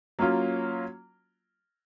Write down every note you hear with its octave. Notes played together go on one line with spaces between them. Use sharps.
F#3 A#3 C#4 F4